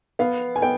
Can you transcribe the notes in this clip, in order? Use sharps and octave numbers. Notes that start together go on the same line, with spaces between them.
B3 F5
G#5
B3 G5